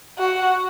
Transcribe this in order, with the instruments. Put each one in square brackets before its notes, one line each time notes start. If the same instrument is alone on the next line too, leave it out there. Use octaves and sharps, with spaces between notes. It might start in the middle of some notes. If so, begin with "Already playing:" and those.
[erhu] F#4